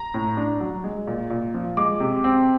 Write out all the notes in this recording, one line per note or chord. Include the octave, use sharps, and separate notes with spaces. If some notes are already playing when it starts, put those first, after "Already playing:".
Already playing: A#5
A2
D4
F#3
G#3
A#2
A#2
F3
G#3 D6
C3
C4